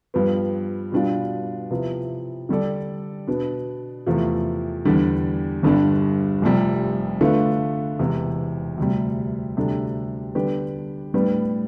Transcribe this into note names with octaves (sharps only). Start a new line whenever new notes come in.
G2 F3 B3
B2 G3 D4 F4
C3 F3 B3 E4
D3 G3 D4 A4 D5
B2 B3 D4
E2 C3 F3 A3
E2 D3 G3 D4 G4
G1 G2 D3 G3 D4
F1 F2 C3 G3
D3 A3 D4 F4 B4
E1 E2 C3
D2 C3 G3
D2 C3 G3 D4 A4
D3 G3 B3 D4 G4
A2 G3 B3 D4